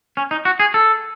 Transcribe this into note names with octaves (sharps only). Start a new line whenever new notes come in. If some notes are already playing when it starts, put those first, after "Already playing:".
C#4
D#4
F#4
G#4
A4